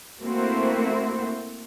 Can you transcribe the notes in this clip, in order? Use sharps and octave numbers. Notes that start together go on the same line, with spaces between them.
A3 A#3 C4 E4 F#4 C5